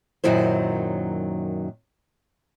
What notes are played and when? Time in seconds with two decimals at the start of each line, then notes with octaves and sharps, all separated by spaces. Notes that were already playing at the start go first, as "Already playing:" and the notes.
0.24 F#2 A#2 D#3 F#3 E4 C5